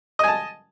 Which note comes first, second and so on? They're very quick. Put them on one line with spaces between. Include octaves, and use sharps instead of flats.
D#5 G#5 A5